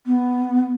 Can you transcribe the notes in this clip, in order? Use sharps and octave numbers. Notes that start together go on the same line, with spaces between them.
B3